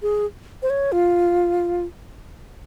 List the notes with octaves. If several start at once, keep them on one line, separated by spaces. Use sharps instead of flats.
G#4
C5
C#5
F4